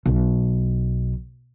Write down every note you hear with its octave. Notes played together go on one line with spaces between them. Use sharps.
B1